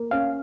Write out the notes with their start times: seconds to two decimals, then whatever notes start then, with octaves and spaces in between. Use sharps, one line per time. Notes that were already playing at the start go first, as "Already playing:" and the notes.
Already playing: A#3
0.11 C#4 F5